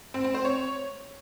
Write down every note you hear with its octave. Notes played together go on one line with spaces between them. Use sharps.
C4
C4
C5
C#5